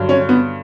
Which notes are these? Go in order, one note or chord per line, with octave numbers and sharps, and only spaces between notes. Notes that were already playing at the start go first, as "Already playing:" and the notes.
Already playing: G2 D3 F#3
C#4
B3